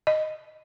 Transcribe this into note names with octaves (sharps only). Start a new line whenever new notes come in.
D#5